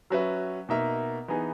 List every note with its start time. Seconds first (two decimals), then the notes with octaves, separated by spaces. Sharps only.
0.10 F#3 C#4 F#4 B4 E5
0.69 B2 A#3 D#4 A#4 E5
1.28 E3 B3 D#4 G#4